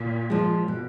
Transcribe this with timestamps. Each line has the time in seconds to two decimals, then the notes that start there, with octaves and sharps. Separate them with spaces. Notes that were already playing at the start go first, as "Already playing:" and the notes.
Already playing: A#2
0.30 F3 G#3
0.68 B2